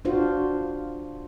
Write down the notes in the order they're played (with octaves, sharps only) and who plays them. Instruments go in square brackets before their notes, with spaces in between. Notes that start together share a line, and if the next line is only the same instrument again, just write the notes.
[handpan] D4 F4 F#4 C5